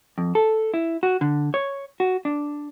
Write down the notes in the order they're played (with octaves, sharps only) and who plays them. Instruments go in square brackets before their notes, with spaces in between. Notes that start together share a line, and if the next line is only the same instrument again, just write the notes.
[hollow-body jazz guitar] F2
A4
E4
F#4
D3
C#5
F#4
D4